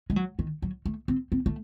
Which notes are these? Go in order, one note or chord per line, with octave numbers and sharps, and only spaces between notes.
G#3
F#3
D#3
F#3
A3
C4
C4
A3